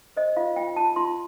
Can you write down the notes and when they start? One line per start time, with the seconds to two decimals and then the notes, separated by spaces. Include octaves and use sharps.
0.17 C5 D#5
0.37 F4 F5
0.56 F4 G5
0.76 F4 A5
0.96 F4 C6